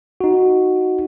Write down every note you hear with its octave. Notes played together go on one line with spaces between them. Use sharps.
D#4 F#4